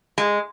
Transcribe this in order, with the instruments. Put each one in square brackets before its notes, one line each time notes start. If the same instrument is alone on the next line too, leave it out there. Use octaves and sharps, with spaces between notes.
[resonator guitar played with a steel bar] G#3